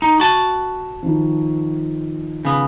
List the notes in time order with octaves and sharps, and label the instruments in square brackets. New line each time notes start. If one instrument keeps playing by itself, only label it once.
[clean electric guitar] D#4
F#4 A5
[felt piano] D#3 F3
[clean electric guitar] C#3 B3